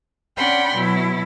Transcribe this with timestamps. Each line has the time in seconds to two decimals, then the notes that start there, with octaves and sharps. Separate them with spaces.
0.36 C#4 D4 F#5 G5 B5 C6
0.73 B2 F#3 E4